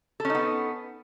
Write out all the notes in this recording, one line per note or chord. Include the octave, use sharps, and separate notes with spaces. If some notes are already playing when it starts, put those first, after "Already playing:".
B3 C#4 D#4 A4